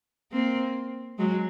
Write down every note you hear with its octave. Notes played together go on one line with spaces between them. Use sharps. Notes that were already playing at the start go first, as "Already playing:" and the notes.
A#3 C4
F#3 G#3